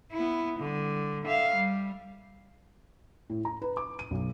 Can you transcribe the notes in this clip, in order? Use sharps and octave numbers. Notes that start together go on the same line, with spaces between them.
B3 E4
D3 G3
E5 F5
G3
A2
A#5
B4
D6
D#7
B1